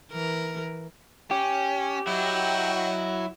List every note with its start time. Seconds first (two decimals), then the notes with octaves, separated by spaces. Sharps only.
0.12 E3 A#4
1.31 C#4 G4
2.07 F#3 E4 F#4 D#5 G5